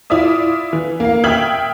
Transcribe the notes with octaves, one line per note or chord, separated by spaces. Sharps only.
E4 F4 D5 E5 D#6
E3
A#3 F5
E5 G5 D#6 F6 G#6 F#7